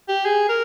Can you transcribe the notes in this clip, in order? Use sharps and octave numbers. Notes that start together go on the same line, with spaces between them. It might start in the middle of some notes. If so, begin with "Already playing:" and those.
G4
G#4
A#4